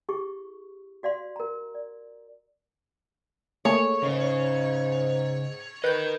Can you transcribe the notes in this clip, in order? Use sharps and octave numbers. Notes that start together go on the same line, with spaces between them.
E4 G4 G#4 C#6
F#4 D5 F5 C6
A#4 A#5
D5
A3 A#3 G#4 C#5
G#2 C#3
A#4 B4 D#5 G6